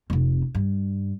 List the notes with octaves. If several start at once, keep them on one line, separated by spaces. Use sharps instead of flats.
F1 C3
G2